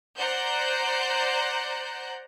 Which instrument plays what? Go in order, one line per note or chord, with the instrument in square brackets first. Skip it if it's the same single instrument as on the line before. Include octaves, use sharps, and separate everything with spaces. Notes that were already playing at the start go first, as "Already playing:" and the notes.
[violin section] C5 D5 F#5 A#5 F#6 G6